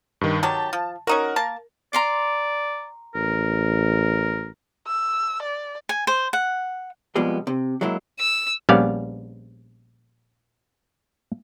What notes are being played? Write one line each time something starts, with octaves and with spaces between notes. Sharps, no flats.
G2 D#3
D#3 F#3 G4 A5
F3
C#4 D#4 F#4 A#4
A#3 A5
D5 A#5 C6 D6
A1 A#4
E6
D5
G#5
C5
F#5
F2 B2 F3 G3 G#3 B3
C3
F#3 G#3 A#3 E4
E6
A#1 G3 B3 C#4 D5 F5